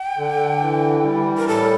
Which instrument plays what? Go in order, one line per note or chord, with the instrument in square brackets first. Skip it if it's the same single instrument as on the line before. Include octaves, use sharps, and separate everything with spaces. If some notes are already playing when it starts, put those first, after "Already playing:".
Already playing: [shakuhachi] G5
[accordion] D3
E3
G3
[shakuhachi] A#4
[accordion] A2 [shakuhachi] A4